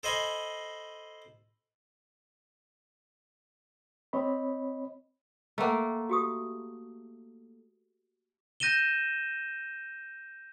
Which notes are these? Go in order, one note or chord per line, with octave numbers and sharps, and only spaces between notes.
A4 C5 D#5 G#5 B5
C4 C#5 D#5 B5
A3 A#3 F#5 G5 A#5
F#4 G4 D#6
G6 A#6 D#7 E7 G7